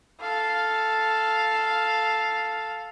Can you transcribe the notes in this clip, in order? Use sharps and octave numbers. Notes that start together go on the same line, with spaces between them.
A4 F5